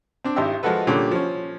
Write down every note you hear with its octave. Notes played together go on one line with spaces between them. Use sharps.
C4 D4
G#1 D#4 E4 G4 E6
F3 G#3 F4 F#4 A4 B4
A#2 D3 G3 C#4 G5
F3 C#4